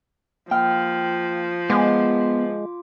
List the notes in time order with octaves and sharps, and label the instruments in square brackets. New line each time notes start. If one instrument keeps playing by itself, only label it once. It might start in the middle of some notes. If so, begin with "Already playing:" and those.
[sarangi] F3 [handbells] A#3 F6 [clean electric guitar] G5
[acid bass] G#3 [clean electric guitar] B3 [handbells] F4 D6